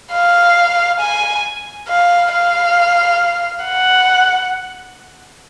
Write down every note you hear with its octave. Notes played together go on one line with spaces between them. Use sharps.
F5
G#5
F5
F5
F#5